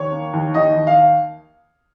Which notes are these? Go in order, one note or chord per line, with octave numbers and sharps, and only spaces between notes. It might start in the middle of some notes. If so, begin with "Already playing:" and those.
Already playing: D#2 C#5
A#3
D#2
D#2 D#5
D#2
F5